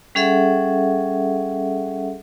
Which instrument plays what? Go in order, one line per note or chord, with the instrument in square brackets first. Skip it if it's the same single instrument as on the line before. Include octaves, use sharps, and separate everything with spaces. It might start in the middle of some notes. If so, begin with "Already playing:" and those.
[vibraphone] G3 C#4 G#4 A4 E5 F#5